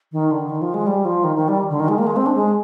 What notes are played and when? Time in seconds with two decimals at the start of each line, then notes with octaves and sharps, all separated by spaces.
0.12 D#3
0.31 D3
0.49 D#3
0.62 F3
0.74 G#3
0.87 G3
1.05 F3
1.24 D#3
1.36 D#3
1.48 G3
1.70 D3
1.80 D#3
1.88 G#3
1.98 A#3
2.07 G#3
2.16 C4
2.26 D4
2.35 G#3